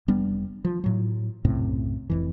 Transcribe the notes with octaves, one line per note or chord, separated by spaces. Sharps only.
F1 G3 B3 D4
F3
A2 F#3
B1 F#2 A2 C3
F1 F2 E3